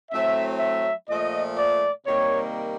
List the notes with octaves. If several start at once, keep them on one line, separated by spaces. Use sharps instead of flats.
A2 F#3 A3 C4 E5
E5
A#2 F3 A3 D#5
D5
C3 D#3 G3 A#3 C#5